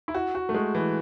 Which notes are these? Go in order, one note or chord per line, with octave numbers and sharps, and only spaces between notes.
E4
F#4
F#4
A3
G#3
E3